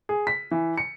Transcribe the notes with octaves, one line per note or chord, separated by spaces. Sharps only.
G#4
B6
E3
C#7